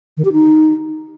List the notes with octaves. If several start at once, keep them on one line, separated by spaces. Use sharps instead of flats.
D#3
G4
D#4